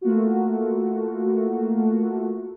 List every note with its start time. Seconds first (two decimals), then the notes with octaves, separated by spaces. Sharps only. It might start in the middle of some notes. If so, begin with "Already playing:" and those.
0.01 A3 A#3 F4 F#4